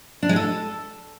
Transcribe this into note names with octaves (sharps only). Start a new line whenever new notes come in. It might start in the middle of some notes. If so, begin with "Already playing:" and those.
D4
G#3
A4